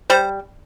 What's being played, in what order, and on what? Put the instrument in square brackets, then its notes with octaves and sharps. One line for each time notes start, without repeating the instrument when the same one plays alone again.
[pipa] G3 [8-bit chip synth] C5